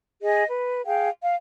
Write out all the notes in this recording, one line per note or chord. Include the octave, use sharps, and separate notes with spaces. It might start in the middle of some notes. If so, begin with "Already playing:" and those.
G#4 D#5
B4
G#4 F5 G5
F5